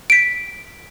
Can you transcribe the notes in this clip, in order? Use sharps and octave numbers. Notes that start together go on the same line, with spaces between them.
B6 D7